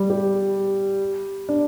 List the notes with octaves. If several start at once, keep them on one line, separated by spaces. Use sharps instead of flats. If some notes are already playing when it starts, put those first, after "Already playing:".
Already playing: G3
G4
D4